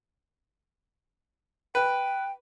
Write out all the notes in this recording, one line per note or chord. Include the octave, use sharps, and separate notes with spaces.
B4 G5